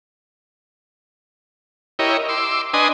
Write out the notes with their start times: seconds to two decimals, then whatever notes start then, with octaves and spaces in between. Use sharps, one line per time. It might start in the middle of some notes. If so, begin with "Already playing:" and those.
1.99 E4 G4 A#4 C#5 D#5
2.29 C6 D6 E6
2.73 D4 B4 D#5 G#5 C6 D#6